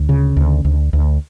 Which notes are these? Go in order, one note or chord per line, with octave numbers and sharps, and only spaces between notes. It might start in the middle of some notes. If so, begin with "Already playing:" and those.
Already playing: D2
C#3
D2
D2
D2